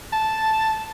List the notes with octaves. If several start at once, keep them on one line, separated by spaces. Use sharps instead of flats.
A5